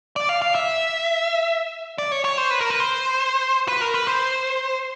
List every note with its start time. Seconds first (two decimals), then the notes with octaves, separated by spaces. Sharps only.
0.16 D5
0.29 F5
0.42 F5
0.55 E5
1.98 D5
2.12 C#5
2.25 C#5
2.37 C5
2.51 B4
2.61 A#4
2.70 B4
2.80 C5
3.68 B4
3.81 A#4
3.94 B4
4.07 C5